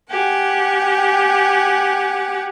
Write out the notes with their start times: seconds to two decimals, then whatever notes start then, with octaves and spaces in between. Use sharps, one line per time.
0.10 G4 F#5 G#5